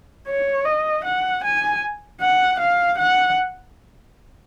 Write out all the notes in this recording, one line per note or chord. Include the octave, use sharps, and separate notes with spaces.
C#5
D#5
F#5
G#5
F#5
F5
F#5